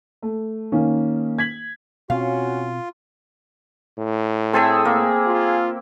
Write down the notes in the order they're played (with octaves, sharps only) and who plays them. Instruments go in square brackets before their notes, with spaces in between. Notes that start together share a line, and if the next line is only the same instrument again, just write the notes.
[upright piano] A3
D#3 A#3 C#4
G#6 B6 F#7
[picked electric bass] B2 C4 [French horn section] C#4 F#4 [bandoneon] F4 [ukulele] F5
[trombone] A2
[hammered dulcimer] C4 A4 E5 [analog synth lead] G#4
[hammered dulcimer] A#3
[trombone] F4